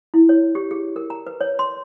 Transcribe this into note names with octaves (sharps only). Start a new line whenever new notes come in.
E4
C#5
G4
G#4
A#4
A#5
B4
C#5
C6